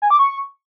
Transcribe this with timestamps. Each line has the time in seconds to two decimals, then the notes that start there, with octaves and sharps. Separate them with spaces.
0.02 G#5
0.10 D6
0.19 C#6